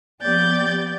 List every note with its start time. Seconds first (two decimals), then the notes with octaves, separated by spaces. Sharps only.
0.22 F3 B3 G4 D5 G6 A6